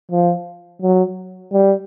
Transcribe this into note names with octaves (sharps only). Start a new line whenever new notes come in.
F3
F#3
G3